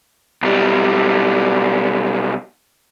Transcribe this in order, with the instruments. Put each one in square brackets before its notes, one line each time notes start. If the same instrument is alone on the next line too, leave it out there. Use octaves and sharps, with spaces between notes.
[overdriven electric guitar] B1 G3